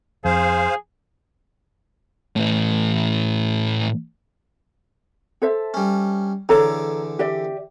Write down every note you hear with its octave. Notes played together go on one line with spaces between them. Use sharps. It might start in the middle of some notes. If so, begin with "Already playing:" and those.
F2 G#4 C5 F5
A2 E3
A4 C5 E5
G3 C#4
E2 D3 A4 C#5 A#5 D6
G4 D5 E5